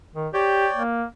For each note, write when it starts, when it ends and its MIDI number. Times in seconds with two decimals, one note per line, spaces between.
0.15 0.28 51
0.34 0.67 67
0.34 0.83 73
0.34 0.83 74
0.34 0.83 79
0.75 1.04 58